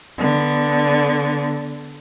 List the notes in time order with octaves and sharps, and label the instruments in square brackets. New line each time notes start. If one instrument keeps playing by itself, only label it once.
[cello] D3 B3